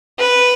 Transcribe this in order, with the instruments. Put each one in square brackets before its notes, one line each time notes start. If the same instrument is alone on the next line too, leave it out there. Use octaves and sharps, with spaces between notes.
[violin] B4